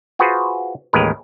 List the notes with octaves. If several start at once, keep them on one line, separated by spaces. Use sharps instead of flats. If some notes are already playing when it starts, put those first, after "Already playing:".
F4 F#4 G#4 B4 C5
A1 D#2 G#3 A#4 B4